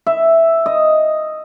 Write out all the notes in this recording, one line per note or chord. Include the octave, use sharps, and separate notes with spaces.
E5
D#5